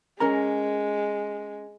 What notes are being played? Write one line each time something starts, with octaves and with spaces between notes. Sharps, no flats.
G#3 C#4 A#4 A#5